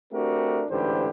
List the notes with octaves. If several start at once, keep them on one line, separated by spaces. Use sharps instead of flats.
A3 C4 D4 F#4 G4 A#4
A1 G#2 D3 G4 B4 C5